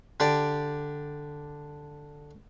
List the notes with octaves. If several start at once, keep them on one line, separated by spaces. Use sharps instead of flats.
D3 G4 D5